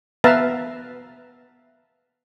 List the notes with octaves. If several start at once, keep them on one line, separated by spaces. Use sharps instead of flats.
B3 B4 E5 F5 A5 A#5